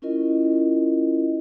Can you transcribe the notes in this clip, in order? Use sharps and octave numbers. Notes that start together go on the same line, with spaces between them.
C#4 E4 F4 A#4 D#5